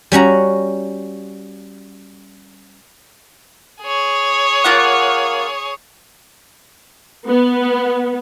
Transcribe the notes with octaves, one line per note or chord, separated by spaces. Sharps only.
G3 C#4 F#4 A#5
G#4 C#5
A#3 F4 F#5
B3